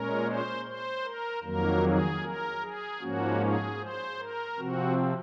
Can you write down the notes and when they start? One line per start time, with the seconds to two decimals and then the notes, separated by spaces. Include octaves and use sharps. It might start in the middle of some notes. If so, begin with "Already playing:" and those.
Already playing: A#2 G#3 C#4 A#4
0.25 C5
0.65 C5
1.04 A#4
1.43 F2 D#3 F#3 A#3 A#4
1.83 G#4
2.22 A#4
2.62 G#4
3.00 G#2 F3 A#3 C#4 F#4
3.41 G#4
3.79 C5
4.19 A#4
4.58 C3 F3 C4 F#4